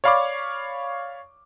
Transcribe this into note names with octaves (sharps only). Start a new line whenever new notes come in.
C#5 D5 F5 B5 C#6 D6